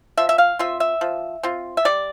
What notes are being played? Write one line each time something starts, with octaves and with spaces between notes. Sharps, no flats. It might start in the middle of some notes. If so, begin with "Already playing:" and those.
F3 E5
E5
F5
C4 F4 E5
E5
F3
C4 F4
E5
G3 D5